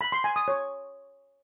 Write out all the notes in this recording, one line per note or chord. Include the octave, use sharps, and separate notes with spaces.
B5
C6
G#5
D#6
C#5